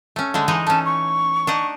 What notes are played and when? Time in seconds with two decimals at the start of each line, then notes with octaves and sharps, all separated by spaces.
0.16 A3 C#4
0.34 D3 G#3 A3
0.48 E3 G#3 D#4
0.67 A3 C#4 A5
0.85 C#6
1.47 D4 D#4 F#5